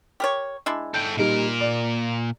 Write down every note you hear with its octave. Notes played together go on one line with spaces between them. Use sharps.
G4 A#4 C#5
G#3 D4 E4
A4 G5 G6
A#2 G3 D#4 A#4
D5